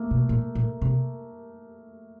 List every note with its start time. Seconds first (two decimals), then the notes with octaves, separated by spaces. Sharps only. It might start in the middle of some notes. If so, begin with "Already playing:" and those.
Already playing: A3 A#3
0.11 B2
0.29 A#2
0.55 A#2
0.82 C3